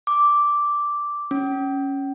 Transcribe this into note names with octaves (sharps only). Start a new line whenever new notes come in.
D6
C#4